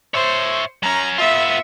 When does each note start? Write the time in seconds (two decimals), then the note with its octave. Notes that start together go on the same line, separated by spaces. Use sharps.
0.14 C5 C#5 E5
0.83 F#3 C#4 A#5
1.18 B3 F4 E5